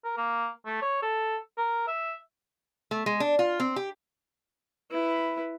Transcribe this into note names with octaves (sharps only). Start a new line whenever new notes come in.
A#4
A#3
A3
C#5
A4
A#4
E5
A3
G#3
D4
F4
C4
G4
E4 B4